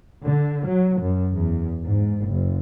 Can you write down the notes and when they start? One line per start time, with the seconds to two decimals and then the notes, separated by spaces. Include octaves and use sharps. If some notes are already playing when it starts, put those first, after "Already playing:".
0.25 D3
0.67 F#3
1.01 F#2
1.33 E2
1.84 G#2
2.28 F#1